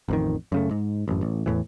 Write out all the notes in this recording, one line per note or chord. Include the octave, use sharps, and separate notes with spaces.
A1 F2 D#3
F#2 C#3 A3
G#2
A1 F#2
A1
E2 A2 E3